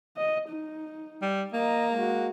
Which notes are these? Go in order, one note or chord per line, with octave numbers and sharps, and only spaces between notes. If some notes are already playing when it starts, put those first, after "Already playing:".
D#5
D#4
G3
A#3 D#5 A#5
G#3 F#4